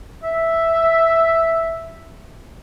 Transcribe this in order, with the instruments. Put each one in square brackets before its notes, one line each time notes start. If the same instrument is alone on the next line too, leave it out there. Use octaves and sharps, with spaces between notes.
[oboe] E5